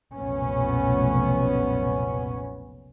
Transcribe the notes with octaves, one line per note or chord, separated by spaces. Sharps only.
F1 B1 A#2 B3 C#4